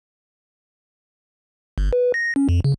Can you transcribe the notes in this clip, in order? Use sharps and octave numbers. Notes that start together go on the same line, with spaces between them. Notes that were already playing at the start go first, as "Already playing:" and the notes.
G1
B4
A#6
C#4
F2
C#3